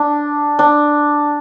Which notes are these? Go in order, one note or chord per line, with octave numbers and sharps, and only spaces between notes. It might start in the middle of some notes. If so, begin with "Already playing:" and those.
Already playing: D4
D4